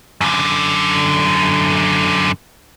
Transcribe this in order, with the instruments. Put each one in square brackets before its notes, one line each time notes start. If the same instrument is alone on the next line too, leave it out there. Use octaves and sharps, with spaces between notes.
[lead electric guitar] F#2 D3